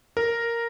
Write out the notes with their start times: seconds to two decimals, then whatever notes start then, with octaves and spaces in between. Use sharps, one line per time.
0.17 A#4